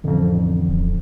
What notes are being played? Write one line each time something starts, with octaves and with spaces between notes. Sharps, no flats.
A1 F2 D3
D1